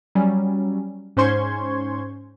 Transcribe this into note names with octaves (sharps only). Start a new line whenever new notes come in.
F#3 G3 C#4
G#2 C#4 C5 C6 C#6 G#6